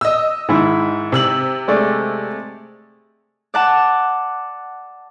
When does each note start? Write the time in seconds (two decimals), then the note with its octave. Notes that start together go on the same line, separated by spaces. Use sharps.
0.01 D#5 E6
0.49 G#2 D#3 E4
1.12 C3 E6 F#7
1.68 G#3 A3 D5
3.54 D5 F#5 A5